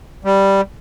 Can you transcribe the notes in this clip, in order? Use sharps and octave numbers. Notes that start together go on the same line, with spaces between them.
G3